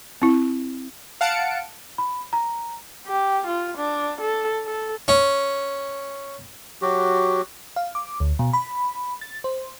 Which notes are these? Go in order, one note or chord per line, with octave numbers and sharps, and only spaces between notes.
C4 E4
F5 F#5 A5 C#7 D7
B5
A#5
G4
F4
D4
A4
A4
C#4
F#3 F#4 G4
F5
D6
D2
B2
B5
A6
C5